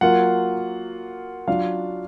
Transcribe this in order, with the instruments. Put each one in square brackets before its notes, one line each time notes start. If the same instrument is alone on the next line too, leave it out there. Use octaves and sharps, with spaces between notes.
[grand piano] F#3 A#3 F4 F#5
F#3 D4 F4 F5